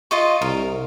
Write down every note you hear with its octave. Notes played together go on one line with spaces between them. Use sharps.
F4 D#5 C#6
C2 A#4